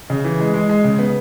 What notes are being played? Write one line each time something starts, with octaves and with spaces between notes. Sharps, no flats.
C#3
E3
G#3
G#3
G#3
C#3
B3